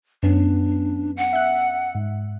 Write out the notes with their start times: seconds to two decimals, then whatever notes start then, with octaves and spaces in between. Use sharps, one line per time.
0.23 F#2 B3 C#4 D4
1.17 F#5
1.33 E5 F#6
1.95 G#2